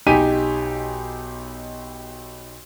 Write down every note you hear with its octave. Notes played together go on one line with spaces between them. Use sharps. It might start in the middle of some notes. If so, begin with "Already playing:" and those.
B1 D#4 G4 G#5 B6 D#7